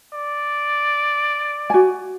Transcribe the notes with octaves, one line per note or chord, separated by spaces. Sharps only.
D5
F#4 G#5